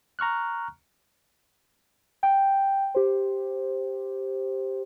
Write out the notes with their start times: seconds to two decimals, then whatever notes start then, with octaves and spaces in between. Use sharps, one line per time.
0.19 A#5 C#6 F6 F#6
2.23 G5
2.95 G4 C5